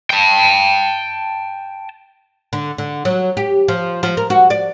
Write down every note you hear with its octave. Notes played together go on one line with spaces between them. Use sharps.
G5 A5
D3
D3
F#3
G4
F3
F3
A#4
F#4
D5